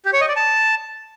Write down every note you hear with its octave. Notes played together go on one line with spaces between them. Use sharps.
G4
C#5
D#5
D5
A5